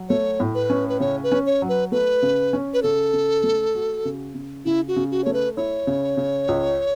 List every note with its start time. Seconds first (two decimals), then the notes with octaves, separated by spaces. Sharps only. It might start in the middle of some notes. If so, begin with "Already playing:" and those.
Already playing: F#3
0.09 A3 C#5
0.40 A2
0.55 B4
0.70 C#4
0.89 B4
1.00 C#3 C#5
1.23 B4
1.32 C#4
1.46 C#5
1.62 F#3
1.68 B4
1.92 A3 B4
2.22 C#3
2.53 C#4
2.74 B4
2.83 C#3 A4
3.13 C#3
3.43 A3
3.75 F#4
4.05 C#3
4.35 C#3
4.65 C#3 E4
4.88 F#4
4.96 C#3
5.11 F#4
5.24 A3 C#5
5.33 B4
5.56 E4 C#5
5.87 C#3
6.17 C#3
6.48 C#2